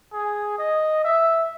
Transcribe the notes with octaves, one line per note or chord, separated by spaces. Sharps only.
G#4
D#5
E5